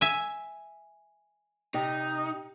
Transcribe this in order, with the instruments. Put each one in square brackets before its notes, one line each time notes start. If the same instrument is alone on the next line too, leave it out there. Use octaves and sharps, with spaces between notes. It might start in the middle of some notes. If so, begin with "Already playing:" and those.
[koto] E5 G#5
[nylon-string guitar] C3 [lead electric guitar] D#4